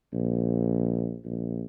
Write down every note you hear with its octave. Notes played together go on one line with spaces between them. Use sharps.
A#1
A#1